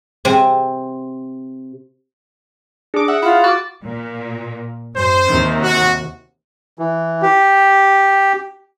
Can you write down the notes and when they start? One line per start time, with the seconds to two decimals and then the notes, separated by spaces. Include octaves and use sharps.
0.25 C3 C4 G#5
2.94 D4 G#4 D6
3.08 E5 F#5
3.23 E4 F4
3.44 F#4 D6 A6
3.83 A#2
4.96 F#2 C5
5.28 D#2 C3 D#3
5.62 F#4
6.79 E3
7.22 G4